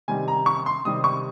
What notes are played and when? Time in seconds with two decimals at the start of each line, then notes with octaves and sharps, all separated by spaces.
0.08 C3 D#3 G3 C4 G#5
0.28 A#5
0.46 C#6
0.66 C6
0.85 C3 D#3 G3 C4 D#6
1.04 C#6